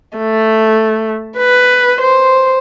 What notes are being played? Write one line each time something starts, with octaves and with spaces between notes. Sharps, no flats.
A3
B4
C5